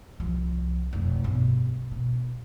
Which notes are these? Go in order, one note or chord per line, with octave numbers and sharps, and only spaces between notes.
C2 F3
F1 B1
G2 B2
B2